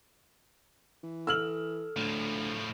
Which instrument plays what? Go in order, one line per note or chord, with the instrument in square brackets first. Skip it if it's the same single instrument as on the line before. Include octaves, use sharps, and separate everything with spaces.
[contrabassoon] E3
[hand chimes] A4 [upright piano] E6 F6 F#7
[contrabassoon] D2 [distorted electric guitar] A2 F3